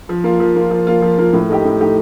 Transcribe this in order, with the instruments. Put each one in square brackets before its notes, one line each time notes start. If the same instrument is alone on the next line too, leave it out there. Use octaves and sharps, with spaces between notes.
[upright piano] F3
A#3 F4
F3
A#3 F4
F3
A#3 F4
F3
A#3 F4
A2
A3 D#4 G4
A2
A3 D#4 G4